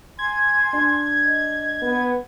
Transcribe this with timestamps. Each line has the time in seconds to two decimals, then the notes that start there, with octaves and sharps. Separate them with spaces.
0.19 G#5 C6 G#6
0.73 D4
1.24 D#5
1.82 B3